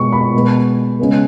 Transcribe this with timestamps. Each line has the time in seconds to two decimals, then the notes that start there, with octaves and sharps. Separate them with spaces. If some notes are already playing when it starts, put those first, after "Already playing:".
Already playing: B2 G#3 B3 C#6
0.12 B5
0.34 B2 G#3 B3
0.99 C#3 G#3 B3